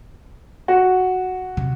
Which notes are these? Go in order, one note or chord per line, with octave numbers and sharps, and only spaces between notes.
F#4
C3